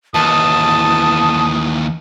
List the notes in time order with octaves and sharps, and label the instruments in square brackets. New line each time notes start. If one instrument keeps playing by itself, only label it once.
[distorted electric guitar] D#2 E3 [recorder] A5 [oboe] D#6